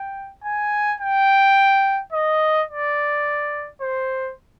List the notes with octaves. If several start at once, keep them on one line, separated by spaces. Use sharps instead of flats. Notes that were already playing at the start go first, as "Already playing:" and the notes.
Already playing: G5
G#5
G5
D#5
D5
C5